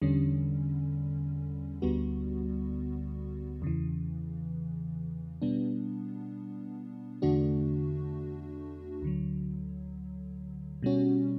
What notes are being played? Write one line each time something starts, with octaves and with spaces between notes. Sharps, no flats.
E2 D3 G3 C#4
D2 D3 G3 B3 F#4
E2 C#3 E3
B2 G3 B3 D4
E2 D3 A3 D4 F#4
D2 D3 F#3
B2 G3 C#4 F#4